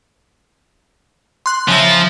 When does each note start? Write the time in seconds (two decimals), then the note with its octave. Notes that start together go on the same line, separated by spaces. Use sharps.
1.46 C6 F#6
1.68 C#3 F3 E5 A#6